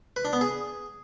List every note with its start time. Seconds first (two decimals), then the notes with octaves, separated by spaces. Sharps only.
0.16 B4
0.25 D4
0.33 B3
0.41 G#4